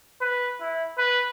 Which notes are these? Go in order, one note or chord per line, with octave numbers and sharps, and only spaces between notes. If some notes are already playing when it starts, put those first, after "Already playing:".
B4
E4
B4